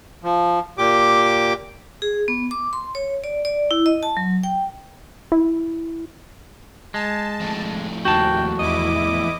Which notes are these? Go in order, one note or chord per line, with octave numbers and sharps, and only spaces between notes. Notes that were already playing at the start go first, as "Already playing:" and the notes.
F3
A#2 G4 D6
G#4
B3
D6
C6
C#5
D5
D5
E4
D#5
A5
F#3
G5
E4
G#3 A5
F2 A2
D#2 F#4 G5 A5
E2 E4 D#5 D6